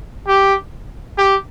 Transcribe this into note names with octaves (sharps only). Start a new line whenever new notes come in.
G4
G4